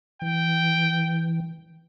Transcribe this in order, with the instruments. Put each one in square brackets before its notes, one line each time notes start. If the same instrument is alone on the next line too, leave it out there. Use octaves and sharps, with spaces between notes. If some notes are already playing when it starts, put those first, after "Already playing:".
[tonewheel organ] E3 [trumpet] G5